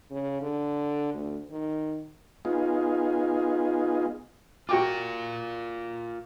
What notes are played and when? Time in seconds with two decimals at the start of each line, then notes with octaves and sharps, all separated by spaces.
0.11 C#3
0.41 D3
1.14 D2
1.50 D#3
2.45 B3 D#4 F4 G#4
4.69 F4 F#4 A#4 G5 D6